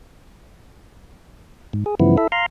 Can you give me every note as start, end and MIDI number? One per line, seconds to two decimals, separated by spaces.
1.73 1.84 44
1.86 1.95 68
2.00 2.17 43
2.00 2.17 49
2.00 2.17 52
2.00 2.17 53
2.00 2.17 59
2.00 2.17 64
2.18 2.28 64
2.18 2.28 69
2.18 2.28 76
2.32 2.46 77
2.32 2.46 82
2.32 2.46 84